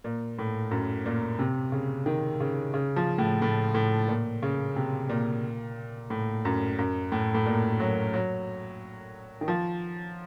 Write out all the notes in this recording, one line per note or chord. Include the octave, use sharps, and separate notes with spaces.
A#2
A2
F#2
A#2
C3
C#3
D#3
C#3
C#3
F3
A2
A2
A2
A#2
C#3
C3
A#2
A2
F#2
F#2
A2
A2
A#2
F#3
F#3
D#3
F3